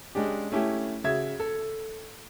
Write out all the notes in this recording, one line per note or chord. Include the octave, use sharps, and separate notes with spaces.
G#3 C#4 D4 G4
A3 C#4 E4 G4
C#3 F#4 E5 G#6
A4